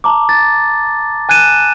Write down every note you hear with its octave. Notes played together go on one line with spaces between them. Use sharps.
A5 A#5 D6
A6
G#5 F#6 G#6 D#7 E7